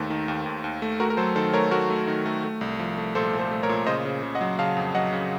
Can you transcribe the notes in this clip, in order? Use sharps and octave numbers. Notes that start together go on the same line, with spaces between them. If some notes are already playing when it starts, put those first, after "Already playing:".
Already playing: D#2 D#3 A3 A4 C5
D#3
D#2
D#2
D#2
A3
A3 F#4 A#4
A#4
F#3 A4 C5
D#3 A4 C5
A3 A#4 C#5
A3 F#4 A#4
A3
D#3
A3
A3
C2
F3
A3
A#2 A4 C5
A#2
A4 C5
A3
A#4 C#5
A#2
C#3 C5 D#5
C#3
C#3
D#5 F#5
F#3
C#3 F5 A5
F2
F#3 D#5 F#5
C#3